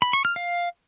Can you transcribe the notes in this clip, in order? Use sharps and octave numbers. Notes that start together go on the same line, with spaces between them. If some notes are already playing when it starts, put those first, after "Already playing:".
B5
C#6
F6
F5